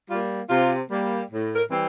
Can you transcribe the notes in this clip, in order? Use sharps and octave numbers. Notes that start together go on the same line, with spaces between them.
G3 A#3 F4
C3 F4
G3 A#3
A2
A#4
E3 G3 C4